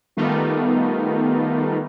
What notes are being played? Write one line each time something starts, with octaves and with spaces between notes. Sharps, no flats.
D#3 G3 A3 B3 D#4 F4